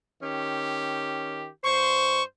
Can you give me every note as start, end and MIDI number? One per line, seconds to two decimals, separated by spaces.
0.22 1.47 51
0.22 1.47 61
0.22 1.47 67
1.64 2.22 43
1.64 2.22 72
1.64 2.23 85